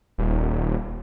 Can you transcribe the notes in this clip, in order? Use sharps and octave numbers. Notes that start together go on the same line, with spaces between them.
D#1